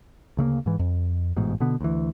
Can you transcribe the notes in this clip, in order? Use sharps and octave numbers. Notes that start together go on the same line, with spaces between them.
D2 C#3 A3 A#3
G#2 E3
F2
A1 G#2 B2
B2 D3 B3
D2 E3